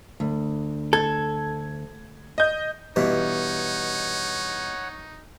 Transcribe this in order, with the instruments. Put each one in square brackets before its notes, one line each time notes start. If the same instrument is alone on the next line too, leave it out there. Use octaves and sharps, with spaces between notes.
[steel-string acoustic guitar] D2
[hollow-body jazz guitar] A4 [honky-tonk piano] G#6
[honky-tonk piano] D#5 G6
[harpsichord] G2 B2 E3 [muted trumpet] D#4 [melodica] C#5 F#5